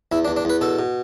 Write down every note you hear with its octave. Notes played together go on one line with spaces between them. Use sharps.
E2 E4
D4
E2
D4
E2 B4
B2 A4
B2